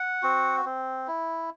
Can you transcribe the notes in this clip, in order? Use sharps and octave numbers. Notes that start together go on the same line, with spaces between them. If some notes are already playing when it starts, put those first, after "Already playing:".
Already playing: F#5
C4 F#4
C4
E4